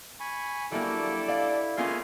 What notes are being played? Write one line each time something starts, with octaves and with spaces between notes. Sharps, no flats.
G#5 B5 C#6
F#3 G3 A#3 D4 E4 G4 A4
D5 F5
D#3 G#3 A#3 B3 C#4 F4 E5 G#5